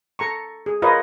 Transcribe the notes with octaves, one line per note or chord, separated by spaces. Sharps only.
A4 A#5 C#6
G#4
F4 A#4 B4 C#5 D#5